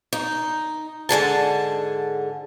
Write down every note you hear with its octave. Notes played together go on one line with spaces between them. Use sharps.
D#4
G#2 D3 G#4 A5